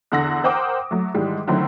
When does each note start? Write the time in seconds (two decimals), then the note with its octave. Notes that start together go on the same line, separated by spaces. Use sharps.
0.12 E2 D3 F#5 E6 A#6
0.44 A#4 C5 F#5 G5 D6 D#6
0.91 F#3 A3
1.14 G#2 D#3 E3 G3 G#3
1.47 D3 D#3 F#3 A3 C4 E4